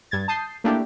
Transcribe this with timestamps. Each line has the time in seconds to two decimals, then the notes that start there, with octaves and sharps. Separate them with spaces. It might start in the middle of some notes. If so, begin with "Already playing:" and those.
0.11 G2 G#6 A6
0.28 A5 D#6 G6 C7
0.64 A3 A#3 D4 E4 G4